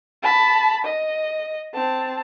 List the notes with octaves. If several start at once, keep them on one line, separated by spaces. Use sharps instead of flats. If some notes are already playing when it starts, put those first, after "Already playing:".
A5 B5
D#5
C4 A5